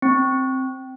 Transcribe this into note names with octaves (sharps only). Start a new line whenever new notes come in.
C4